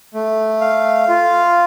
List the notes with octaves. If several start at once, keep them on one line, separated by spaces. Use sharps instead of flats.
A3
F5
F4